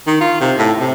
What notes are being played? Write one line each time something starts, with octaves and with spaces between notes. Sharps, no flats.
D#3
F4
C3
A2
C3